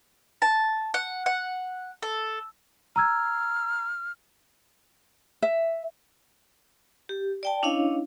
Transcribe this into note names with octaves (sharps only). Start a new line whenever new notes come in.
A5
F#5
F#5
A4
A#5 E6 F6 G#6
E5
G4
D5 G5 A5
C#4 D4 E4 C#5 D#5 F5